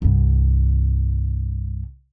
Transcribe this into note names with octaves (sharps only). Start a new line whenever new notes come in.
C2 G2